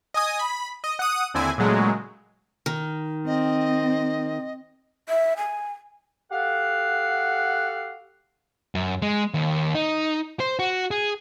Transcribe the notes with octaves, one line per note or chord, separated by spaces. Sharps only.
D#5 G#5 D#6
B5
D#5
F#5 D#6
D#2 D3 C4 E4 G#5
A#2 C#3 F#3 G#3 A3
D#3
C4 D#5
E5
G#5
F#4 G4 A4 F5 F#5
F#2
G#3
D#2
D#4
C5
F#4
G#4